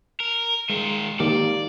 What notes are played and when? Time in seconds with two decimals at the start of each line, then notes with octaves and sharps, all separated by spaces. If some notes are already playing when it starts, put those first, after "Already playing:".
0.20 A#4
0.70 D#3 G#3 F4
1.20 D#3 A#3 G4 D5